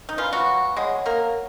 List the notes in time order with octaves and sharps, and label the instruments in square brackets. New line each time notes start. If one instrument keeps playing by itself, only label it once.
[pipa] D#4
[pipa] F3 F4 [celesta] B4 F5 G#5 B5
[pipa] F#3 F#4
[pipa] G#3 G#4 [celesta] C#5 F#5 C#6
[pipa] A#3 A#4